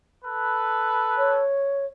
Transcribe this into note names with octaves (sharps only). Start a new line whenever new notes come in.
A4 B4
C#5